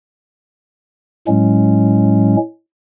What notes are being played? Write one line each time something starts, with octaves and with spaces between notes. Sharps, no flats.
A2 F#3 G#3 C#4